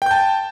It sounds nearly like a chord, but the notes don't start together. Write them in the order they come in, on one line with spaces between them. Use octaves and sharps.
G5 G6 A5